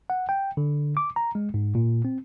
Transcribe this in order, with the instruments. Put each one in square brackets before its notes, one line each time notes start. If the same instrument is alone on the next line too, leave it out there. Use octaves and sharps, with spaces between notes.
[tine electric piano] F#5
G5
D3
D6
A#5
G#3
G#2
A#2
C4